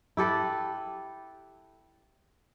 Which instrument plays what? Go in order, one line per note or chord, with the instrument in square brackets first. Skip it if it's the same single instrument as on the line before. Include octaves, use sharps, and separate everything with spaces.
[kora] E4 G4 A4 B4